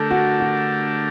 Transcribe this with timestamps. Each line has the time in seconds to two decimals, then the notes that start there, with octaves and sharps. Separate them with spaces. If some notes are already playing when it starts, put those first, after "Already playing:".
Already playing: D3 A3 D4 G4 A4 A#4
0.11 F#4
0.40 F#4